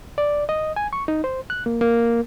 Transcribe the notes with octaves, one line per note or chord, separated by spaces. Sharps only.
D5
D#5
G#5
C#6
D#4
C5
F#6
A#3
A#3